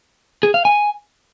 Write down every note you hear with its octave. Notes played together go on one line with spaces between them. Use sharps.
G#4
F5
G#5